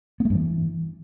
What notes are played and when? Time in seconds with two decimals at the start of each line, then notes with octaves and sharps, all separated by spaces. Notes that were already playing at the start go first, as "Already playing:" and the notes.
0.20 B3
0.25 A3
0.30 G2
0.35 E3